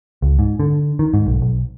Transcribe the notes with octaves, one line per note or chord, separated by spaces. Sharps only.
C#2
G#2
D3
D#3
G#2
B1
B1